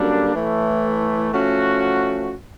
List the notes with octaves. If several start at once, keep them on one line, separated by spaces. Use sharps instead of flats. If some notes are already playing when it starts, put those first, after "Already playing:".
Already playing: F#2 D3 G3 A#3 D4
A2 E3 A3
F3 A3 C#4 F#4